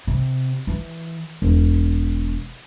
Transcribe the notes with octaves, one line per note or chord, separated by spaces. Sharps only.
C3
E3
E1